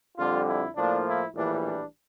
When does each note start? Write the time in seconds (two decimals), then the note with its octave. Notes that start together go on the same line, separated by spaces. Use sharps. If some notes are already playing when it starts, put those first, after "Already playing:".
0.18 F2 D3 G3 F4
0.47 E4
0.76 A2 F3 A#3 D4
1.05 E4
1.35 A#1 A2 E3 G3 D4
1.64 D4